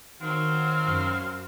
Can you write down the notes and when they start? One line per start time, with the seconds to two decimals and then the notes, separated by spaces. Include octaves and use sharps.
0.22 D#3 F#3 C4 F5
0.84 F#2